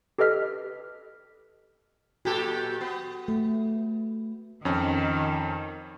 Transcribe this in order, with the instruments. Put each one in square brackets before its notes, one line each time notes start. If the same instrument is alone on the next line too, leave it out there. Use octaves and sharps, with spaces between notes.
[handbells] G4 A4 B4 D#5 F6 B6
[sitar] A#2 G4 A4 [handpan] F#4
[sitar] B3
[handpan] A3
[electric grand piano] F2 C#4 [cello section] D#3